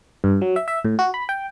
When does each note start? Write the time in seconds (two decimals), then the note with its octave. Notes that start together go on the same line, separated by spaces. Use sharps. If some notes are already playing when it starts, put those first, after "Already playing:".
0.24 G2
0.42 F#3
0.56 E5
0.68 E5
0.85 A2
0.99 F#4
1.14 B5
1.29 G5